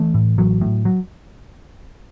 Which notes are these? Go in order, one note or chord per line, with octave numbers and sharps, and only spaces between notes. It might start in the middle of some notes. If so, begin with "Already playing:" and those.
Already playing: E3 A3
A2
A1 F#3
A2
F#3